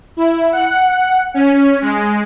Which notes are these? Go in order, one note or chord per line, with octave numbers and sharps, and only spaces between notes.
E4
F#5
C#4
G#3